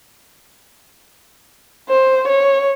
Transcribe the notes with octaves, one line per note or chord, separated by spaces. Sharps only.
C5
C#5